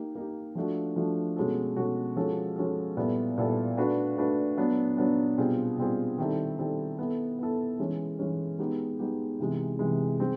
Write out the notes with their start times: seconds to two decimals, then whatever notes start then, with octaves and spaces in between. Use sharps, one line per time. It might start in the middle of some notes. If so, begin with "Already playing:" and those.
Already playing: A#3 D#4 G4
0.15 A#3 D#4 G4
0.55 F3 A3 D4 F#4
0.96 F3 A3 D4 F#4
1.36 B2 G#3 C#4 F#4 A4
1.76 B2 G#3 C#4 F#4 A4
2.16 F3 G#3 C#4 F#4 A4
2.56 F3 G#3 C#4 F#4 A4
2.97 A#2 G3 B3 E4 A4
3.37 A#2 G3 B3 E4 A4
3.77 A3 D4 F#4 B4
4.17 A3 D4 F#4 B4
4.57 F#3 B3 D4
4.97 F#3 B3 D4
5.38 B2 G3 C4 F4 G#4
5.78 B2 G3 C4 F4 G#4
6.18 D#3 G3 C4 E4 A4
6.58 D#3 G3 C4 E4 A4
6.99 B3 E4 A4
7.39 B3 E4 A4
7.79 E3 G#3 C#4
8.19 E3 G#3 C#4
8.59 G#3 B3 D#4 G4
8.99 G#3 B3 D#4 G4
9.40 C3 E3 G#3
9.79 C3 E3 G#3
10.20 G#3 C4